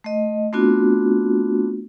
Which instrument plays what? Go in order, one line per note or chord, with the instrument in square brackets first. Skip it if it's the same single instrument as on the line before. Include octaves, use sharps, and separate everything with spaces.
[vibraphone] A3 D#5
A3 B3 C4 D4 F4 F#4